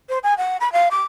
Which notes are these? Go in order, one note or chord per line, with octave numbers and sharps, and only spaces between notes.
C5
G#5
F#5
B5
F5
D6